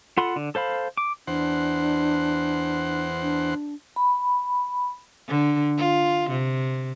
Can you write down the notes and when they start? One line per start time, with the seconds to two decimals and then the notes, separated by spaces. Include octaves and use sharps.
0.17 F4 A4 F#5 B5 C6
0.36 D3
0.55 A4 C5 F5 B5
0.97 D6
1.27 E2 D4 C5 F#5
3.22 D4
3.96 B5
5.28 D3
5.77 F4
6.30 C3